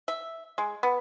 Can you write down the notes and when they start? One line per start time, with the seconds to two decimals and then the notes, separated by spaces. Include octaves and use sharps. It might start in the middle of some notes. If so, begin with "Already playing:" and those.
0.08 E5
0.58 G#3
0.83 B3